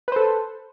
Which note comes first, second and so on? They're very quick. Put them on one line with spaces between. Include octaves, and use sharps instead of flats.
B4 C5 A4